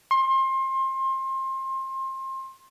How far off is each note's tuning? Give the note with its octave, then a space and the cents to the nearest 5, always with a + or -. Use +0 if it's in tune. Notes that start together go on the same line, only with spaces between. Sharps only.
C6 +30